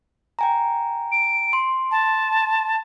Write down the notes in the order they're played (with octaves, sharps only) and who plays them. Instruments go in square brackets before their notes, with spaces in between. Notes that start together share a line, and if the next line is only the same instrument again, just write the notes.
[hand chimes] G5 G#5 A#5
[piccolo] D7
[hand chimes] C6
[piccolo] A5